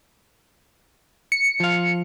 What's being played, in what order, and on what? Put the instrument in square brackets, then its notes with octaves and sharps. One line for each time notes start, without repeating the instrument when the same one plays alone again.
[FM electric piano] C#7
[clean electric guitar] F3 F5